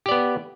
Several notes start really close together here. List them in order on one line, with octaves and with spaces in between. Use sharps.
G4 D5 B3